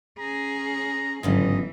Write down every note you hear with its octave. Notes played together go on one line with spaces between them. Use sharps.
C#4 G#4 A#5
G1 G#2 C#3 E3 F#3 D#5